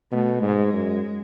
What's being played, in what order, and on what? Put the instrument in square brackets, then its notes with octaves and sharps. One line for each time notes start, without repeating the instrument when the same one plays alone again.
[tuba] B2 [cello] A3
[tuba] G#2 [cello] G#3
[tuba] F#2